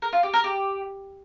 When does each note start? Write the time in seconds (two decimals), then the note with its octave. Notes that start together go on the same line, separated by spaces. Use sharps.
0.02 A#4
0.13 F4
0.23 G4
0.33 A#4
0.44 G4